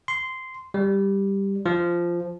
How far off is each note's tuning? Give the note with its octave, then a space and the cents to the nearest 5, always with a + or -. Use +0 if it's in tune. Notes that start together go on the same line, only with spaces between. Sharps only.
C6 -10
G3 +5
F3 -10